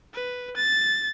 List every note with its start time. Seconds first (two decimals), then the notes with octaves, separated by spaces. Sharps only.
0.13 B4
0.56 A6